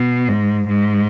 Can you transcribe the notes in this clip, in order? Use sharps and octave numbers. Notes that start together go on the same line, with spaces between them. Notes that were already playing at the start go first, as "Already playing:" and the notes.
Already playing: B2
G#2
G#2